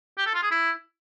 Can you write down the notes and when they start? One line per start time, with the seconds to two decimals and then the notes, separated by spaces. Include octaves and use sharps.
0.18 G4
0.26 A4
0.34 F4
0.43 G#4
0.51 E4